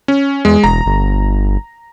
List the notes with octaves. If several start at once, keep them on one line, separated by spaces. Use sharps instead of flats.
C#4
E2 G#3
E1 A#5
G1